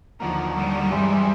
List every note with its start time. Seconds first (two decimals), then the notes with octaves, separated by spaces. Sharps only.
0.19 D#2 D3 F3 F#3 A#3
0.56 G3
0.91 G2 E3 G#3 C4